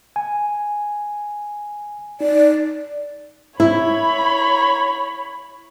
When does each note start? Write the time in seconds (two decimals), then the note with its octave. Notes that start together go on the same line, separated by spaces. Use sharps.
0.16 G#5
2.21 D#4 D5
3.60 E4 C#5 B5